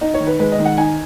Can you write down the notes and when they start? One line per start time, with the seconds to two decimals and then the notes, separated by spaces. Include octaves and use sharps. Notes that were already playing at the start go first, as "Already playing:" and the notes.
0.01 D#4 D#5
0.14 C#5
0.20 D#3
0.27 B4
0.39 G#3 B4
0.52 D#5
0.59 D#3
0.65 F#5
0.77 D#4 G#5